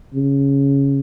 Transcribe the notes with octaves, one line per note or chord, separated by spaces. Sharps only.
C#3